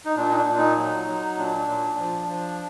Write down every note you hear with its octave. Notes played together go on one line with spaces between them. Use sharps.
D#4
A#2 D4
D#4
D4
A#2
D#4
F#3
F#3
A#2 D4
A#2
F3
F3